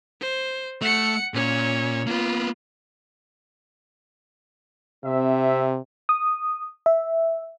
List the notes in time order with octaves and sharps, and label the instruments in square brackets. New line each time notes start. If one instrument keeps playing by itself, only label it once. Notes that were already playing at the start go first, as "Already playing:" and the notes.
[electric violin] C5
[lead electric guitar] A3 [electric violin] F#5 C#7
[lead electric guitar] A#2 [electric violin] C#4 C#5
[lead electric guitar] A#3 B3 [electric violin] F4
[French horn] C3 [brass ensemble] C4 E5
[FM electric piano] D#6
E5